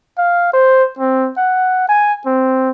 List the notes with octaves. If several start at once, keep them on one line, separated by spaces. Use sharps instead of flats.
F5
C5
C4
F#5
G#5
C4